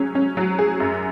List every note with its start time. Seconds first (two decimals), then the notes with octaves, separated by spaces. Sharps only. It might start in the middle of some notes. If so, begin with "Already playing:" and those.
Already playing: F#3 C#4 G#4
0.15 C#4
0.37 F#3
0.59 G#4
0.80 F#2